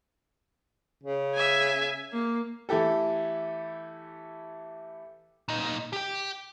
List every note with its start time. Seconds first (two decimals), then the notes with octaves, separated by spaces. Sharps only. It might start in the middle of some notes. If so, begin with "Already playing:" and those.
1.03 C#3
1.35 E5 G#5
2.13 A#3
2.69 E3 A3 E4 G4 A4
5.49 A#2 D#4
5.93 G4 G5